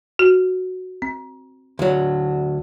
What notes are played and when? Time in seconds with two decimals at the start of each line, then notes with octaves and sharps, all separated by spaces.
0.19 F#4
1.02 C4
1.79 D2 F#3